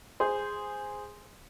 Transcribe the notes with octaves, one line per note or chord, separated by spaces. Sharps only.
G#4 C5